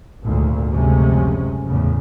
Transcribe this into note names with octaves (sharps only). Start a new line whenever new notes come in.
G#1 D2 A#2
F#1 D2 C3 F3 G#3 C#4
E2 A2 C#3